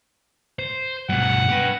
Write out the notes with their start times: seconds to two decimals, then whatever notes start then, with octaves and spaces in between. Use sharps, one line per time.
0.59 C5
1.09 G2 B2 F#5
1.48 G4 B4